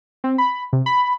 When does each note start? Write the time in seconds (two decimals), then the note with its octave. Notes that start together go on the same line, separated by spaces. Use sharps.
0.24 C4
0.38 B5
0.73 C3
0.86 B5